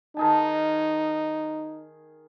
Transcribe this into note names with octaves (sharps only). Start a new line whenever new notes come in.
D#3 D#4 G#4 A5